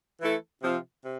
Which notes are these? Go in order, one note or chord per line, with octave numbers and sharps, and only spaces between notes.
E3 A3 E4 A4
C3 F3 C4 F4
C3